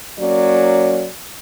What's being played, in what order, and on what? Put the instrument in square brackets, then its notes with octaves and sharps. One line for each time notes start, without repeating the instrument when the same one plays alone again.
[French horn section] F#3 A#3 C#4 D5